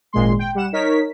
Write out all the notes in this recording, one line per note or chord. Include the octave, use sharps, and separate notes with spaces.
G#1 A#2 G#3 C6
G5
G3 F#5 E7
D#4 A#4 C#5 B6